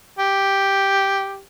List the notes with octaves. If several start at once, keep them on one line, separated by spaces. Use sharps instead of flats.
G4